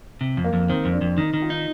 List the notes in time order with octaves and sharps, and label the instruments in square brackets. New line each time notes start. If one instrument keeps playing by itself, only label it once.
[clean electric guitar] C3
F2
[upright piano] A#3
[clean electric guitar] F2
[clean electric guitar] D#3 [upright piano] C4
[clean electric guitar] F2
[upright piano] D4
[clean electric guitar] F2
[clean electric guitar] D#3 [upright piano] D#4
[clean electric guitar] D#3
[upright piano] F4
[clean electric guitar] D#4